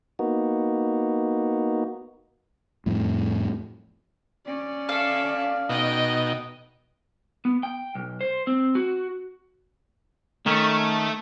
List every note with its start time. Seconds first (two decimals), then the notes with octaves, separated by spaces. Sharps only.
0.19 A#3 B3 D#4 F#4
2.86 F2 A2
4.46 C#4 D5
4.89 A4 E5 F5
5.69 B2 D#4 D#5 G5
7.45 B3
7.63 G5
7.95 B1
8.21 C5
8.47 C4
8.75 F#4
10.46 D#3 A3 C#4